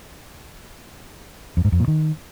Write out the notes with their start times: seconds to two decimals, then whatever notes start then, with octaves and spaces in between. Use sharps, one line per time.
1.57 F2
1.65 G#2
1.72 F2
1.80 A#2
1.88 D#3